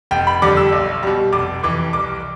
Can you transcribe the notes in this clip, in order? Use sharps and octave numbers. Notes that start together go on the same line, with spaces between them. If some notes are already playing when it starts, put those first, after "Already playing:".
F1 G5
B5
F2 D3 G3 D6
E6
B1
B2 G3
F1 D6
F2 E3 D6
C2 D6